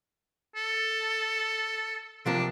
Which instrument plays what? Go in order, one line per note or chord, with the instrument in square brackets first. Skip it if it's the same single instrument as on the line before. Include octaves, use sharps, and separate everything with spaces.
[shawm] A4
[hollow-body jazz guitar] C3 F3 A#3 [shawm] D4